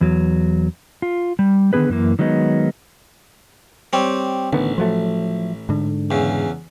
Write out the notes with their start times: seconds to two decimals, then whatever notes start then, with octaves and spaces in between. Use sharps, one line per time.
0.01 E2 F#3
1.02 F4
1.39 G3
1.73 D3 D#3 B3 G#4 B4
1.90 F#2 E3 A#3
2.19 D#3 F#3 G#3 B3 D#4
3.93 G3 C4 C#5
4.53 A1 D3 D#3 B3
4.78 F3 F#3 A3
5.69 G#2 D3
6.11 E2 C#3